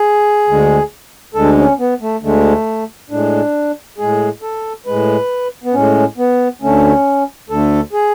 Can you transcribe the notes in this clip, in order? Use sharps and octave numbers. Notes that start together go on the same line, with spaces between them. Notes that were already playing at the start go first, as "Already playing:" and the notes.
Already playing: G#4
D2 D3 G#3
D2 D3 G#3 A4
C#4
B3
A3
D2 D3 G#3 A3
A2 G#3 D4
A2 G#3 G#4
A4
A2 G#3 B4
B3
A2 G#3 C#4
B3
D2 D3 A3 C#4
D2 D3 A3 A4
G#4